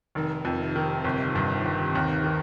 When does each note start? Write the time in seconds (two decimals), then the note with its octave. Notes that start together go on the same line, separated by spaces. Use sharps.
0.15 F1 D#3
0.45 F2
0.61 C3
0.76 D#3
1.04 G1 C3
1.35 G2
1.65 G1
1.95 D#2
2.24 D#3